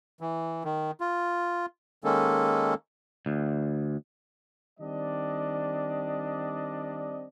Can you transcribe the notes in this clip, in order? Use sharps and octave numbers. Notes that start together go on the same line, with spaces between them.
E3
D#3
F4
D#3 G#3 A#3 C#4 A4
D2
D#3 G3 C4 D4 D5 D#5